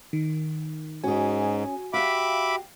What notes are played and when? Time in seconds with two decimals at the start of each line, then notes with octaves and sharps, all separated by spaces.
0.13 D#3
1.04 G#2 C#4 F#4 G#4 G#5
1.94 F#4 G4 E5 F5 B5 D6